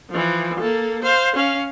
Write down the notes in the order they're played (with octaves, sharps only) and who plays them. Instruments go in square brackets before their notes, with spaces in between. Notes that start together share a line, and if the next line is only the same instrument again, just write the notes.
[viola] E3 F3
A#3 A4
C5 F5
C#4 F5